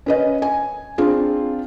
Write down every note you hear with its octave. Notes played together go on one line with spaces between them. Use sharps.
C#4 B4 D#5
G#5
C4 D4 F4 G#4